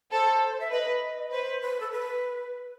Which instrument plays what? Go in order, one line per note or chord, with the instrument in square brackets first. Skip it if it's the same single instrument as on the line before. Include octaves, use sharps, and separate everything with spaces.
[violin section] A4 [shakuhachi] C5
[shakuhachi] E5
[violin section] B4 [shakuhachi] D#5
[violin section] B4 [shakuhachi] C5
[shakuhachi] B4
A4
B4